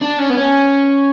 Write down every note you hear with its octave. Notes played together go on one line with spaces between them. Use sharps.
D4
C#4
B3
C#4